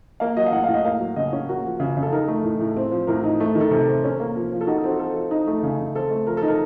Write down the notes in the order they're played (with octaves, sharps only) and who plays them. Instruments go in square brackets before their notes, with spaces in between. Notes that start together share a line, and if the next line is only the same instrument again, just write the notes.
[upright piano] A#3 F5
F#3 D#5
F5
A2 F#5
F5
A2
D#5
A#3 F5
F#3
C#3 D#5
C#4
A#3 F#4
F3
C#3
C#3
A4
D#4 A#4
A3
A2
A2
C4
F3
A2 A#4
D#4
A3
D#3
A4
C3 A4
C4
C#4
A#3
F3
F3
A4
D#4 F#4
A4
C4 F#4
F3 A4
F3
D#4
A3
C#3
C#3
C4 A4
A3
F3 A#4
A4
D#4
A#4